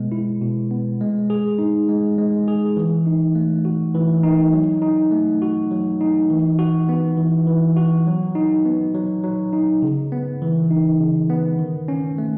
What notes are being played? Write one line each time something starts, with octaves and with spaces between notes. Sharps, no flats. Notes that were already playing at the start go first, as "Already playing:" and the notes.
Already playing: B2 G#3 B3
E4
B2
B3
G#3
G#4
D#4
G#3
G#3
G#4
E3
D#4
A3
F#4
E3
D#4
F#3
D#4
A3
F#4
F#3
D#4
E3
F#4
B3
E3
E3
F#4
F#3
D#4
B3
F#3
F#3
D#4
C#3
B3
E3
D#4
C#3
B3
D#3
C#4
A3